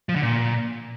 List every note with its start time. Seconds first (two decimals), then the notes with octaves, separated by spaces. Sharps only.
0.09 F3
0.16 D3
0.22 A#2